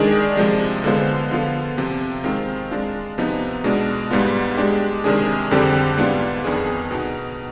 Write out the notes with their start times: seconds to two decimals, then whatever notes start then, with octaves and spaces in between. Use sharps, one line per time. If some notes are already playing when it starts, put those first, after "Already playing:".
Already playing: D#3 G#3 D4 G#4 D5
0.37 C3 F3 G#3
0.84 D3 G#3 B3 F4 C5
1.31 D3 F3 B3 F4
1.77 C3 F3 C4 F4
2.24 D#3 G#3 C4 F4
2.71 G#3 D4 F4
3.18 C3 F3 B3 D#4
3.64 B2 G#3 D4
4.11 G#2 G3 B3 F4
4.57 G#3 D4 G4
5.04 C3 D#3 G#3 D4 G#4
5.51 F2 D3 G3 C4 G4
5.97 G#2 G3 B3 D4 F4
6.44 F2 D#3 B3 D4 G#4
6.91 B2 B3 D#4